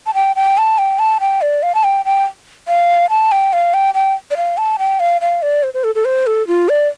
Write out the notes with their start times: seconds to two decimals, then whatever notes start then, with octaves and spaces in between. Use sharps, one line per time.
0.07 A5
0.14 G5
0.36 G5
0.58 A5
0.78 G5
0.99 A5
1.20 G5
1.42 D5
1.63 F5
1.75 A5
1.84 G5
2.05 G5
2.68 F5
3.10 A5
3.32 G5
3.53 F5
3.74 G5
3.94 G5
4.31 D5
4.37 F5
4.58 A5
4.79 G5
5.00 F5
5.21 F5
5.42 D5
5.63 C5
5.74 C5
5.84 A4
5.95 A4
6.05 C5
6.27 A4
6.47 F4
6.69 D5